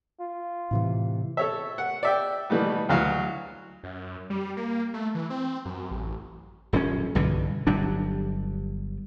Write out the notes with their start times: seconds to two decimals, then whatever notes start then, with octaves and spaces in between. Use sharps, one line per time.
0.20 F4
0.71 A2 C3 E3
1.37 A4 C#5 E5
1.78 F#5
2.03 D5 E5 G5
2.50 B2 E3 G3 A3 B3
2.89 D2 E3 F#3 F5
3.84 F#2
4.30 G3
4.57 A#3
4.94 A3
5.15 E3
5.30 C4
5.65 F#2
5.91 A1
6.73 D#1 F#2 F#3 C#4
7.15 B1 G2 D3 E3
7.67 G1 F#3 G3 D4